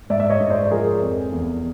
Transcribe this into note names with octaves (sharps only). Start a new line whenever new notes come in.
G#2 D5 E5
E5
C#5 D#5
G#2
C5 D5
F3 G#4 A#4
F2
E2